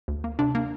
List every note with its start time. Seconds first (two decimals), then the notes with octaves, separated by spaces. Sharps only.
0.08 D2
0.24 A#3
0.39 C3 D4
0.55 A#3